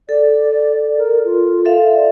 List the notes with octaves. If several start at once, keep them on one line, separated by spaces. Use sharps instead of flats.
A4 D5
A#4
F4
A4 E5 F5
D5